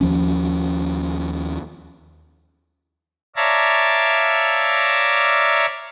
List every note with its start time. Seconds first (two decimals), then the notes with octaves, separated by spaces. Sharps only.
0.01 D#2 F3 C#4
3.36 C#5 D5 E5 F5 A5 A#5